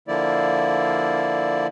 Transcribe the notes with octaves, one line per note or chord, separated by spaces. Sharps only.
D3 F3 A#3 E4 D5